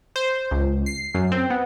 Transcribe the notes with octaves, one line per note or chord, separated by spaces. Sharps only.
C5
C#2
C7
F#2
C4
B3